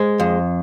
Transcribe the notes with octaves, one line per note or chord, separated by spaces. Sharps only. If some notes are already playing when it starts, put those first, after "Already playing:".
Already playing: G#3 C5
F2